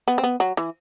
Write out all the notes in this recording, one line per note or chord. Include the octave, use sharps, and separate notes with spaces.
B3
C4
B3
F#3
E3